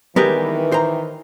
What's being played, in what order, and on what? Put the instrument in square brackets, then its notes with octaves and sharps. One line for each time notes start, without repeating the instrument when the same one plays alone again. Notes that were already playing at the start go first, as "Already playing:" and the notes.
[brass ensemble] D#3 E3 [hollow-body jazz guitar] G3 G#3 B3 [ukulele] G4 A#4 B4
[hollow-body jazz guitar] C5 A#5